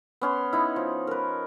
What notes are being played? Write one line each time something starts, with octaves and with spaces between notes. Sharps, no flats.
B3 C#4 C6
D#4 E4
F3
A#4 B4